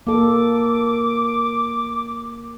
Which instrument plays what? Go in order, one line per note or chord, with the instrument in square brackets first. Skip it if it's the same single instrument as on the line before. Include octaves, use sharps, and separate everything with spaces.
[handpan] A#3 A4 [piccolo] D6